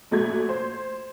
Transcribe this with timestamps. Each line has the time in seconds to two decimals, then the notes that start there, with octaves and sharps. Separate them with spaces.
0.11 A#1 A3 F#4 G#6
0.49 C5